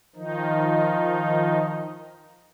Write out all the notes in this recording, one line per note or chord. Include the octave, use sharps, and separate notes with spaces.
D#3 F3 D#4